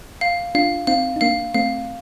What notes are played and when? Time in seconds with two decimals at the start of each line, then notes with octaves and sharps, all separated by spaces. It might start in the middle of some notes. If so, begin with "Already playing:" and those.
0.21 F5
0.55 D4 F4 F5
0.87 C4 D#4 F5
1.16 D#4
1.21 A#3 D4 F5
1.54 A3 C4 F5